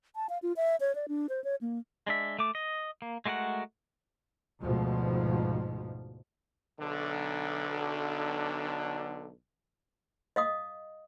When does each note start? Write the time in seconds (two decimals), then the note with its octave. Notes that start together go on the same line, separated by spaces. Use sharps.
0.16 A5
0.29 F5
0.43 F4
0.57 E5
0.80 C#5
0.95 D5
1.08 D4
1.29 C5
1.44 C#5
1.61 A#3
2.06 G#3 D4 E5
2.39 A3 D6
2.55 D#5
3.02 A#3
3.26 G#3 A3 F#4 A#4 F#5
4.61 D2 G#2 B2 F3
6.79 B1 D3
10.36 D#5 F5 D#6